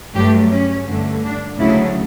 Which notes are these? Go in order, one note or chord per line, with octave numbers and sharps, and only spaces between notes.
G2 F#3 A3 G4
C#4
G2 D3 A3
D4
D2 C#3 F#3 A3 E4